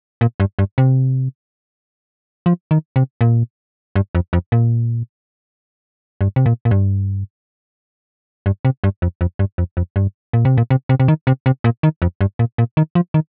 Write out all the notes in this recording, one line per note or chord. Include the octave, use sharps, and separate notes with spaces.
A#2
G2
G2
C3
F3
D#3
C3
A#2
G2
F2
F2
A#2
G2
C3
A#2
A#2
G2
G2
C3
G2
F2
F2
G2
F2
F2
G2
A#2
C3
A#2
C3
C3
C3
D#3
C3
C3
A#2
D#3
F2
G2
A#2
A#2
D#3
F3
D#3